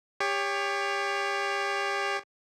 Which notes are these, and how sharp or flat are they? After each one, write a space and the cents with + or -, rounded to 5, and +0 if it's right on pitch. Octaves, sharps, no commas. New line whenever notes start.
G4 +30 C#5 +15